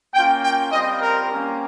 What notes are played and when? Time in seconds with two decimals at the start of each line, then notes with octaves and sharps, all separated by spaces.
0.14 A#3 C#4 F4 G5
0.44 G5
0.72 G3 C4 F4 D#5
1.01 A#4
1.30 A#3 C#4 G4